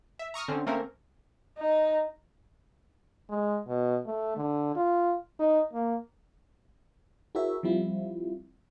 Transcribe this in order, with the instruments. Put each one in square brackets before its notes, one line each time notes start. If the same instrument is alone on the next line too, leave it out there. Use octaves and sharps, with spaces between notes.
[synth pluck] E5
A#5 C#6 D#6 F6
D3 C4 C#4
A3 A#3 C4 C#4 A#4
[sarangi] D#4
[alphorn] G#3
B2
A3
D3
F4
D#4
A#3
[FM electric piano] E4 F#4 G#4 A#4 C#5 E5
F3 G3 C4 E4 F4